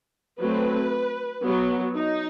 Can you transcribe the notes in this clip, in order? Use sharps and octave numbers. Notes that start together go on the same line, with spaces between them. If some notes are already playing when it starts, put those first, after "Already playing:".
F#3 A3 C4 B4
F#3 B3
D#4